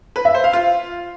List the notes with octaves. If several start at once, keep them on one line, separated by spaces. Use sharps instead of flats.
B4
E5
C5
F5
F4